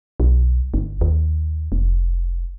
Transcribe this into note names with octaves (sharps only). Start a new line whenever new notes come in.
B1
G1
D#2
F1